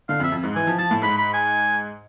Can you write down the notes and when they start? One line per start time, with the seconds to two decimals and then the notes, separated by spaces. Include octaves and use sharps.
0.09 D3 F5
0.20 F2
0.24 E5
0.32 F2
0.43 G#2
0.55 E3 G#5
0.67 F3
0.78 F3 A5
0.91 A2
1.02 G#2 B5
1.18 B5
1.34 G#5